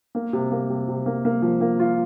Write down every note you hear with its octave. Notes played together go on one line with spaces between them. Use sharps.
A#3
C3
A#3
C3
C3
A#3
A#3
F3
A#3
F4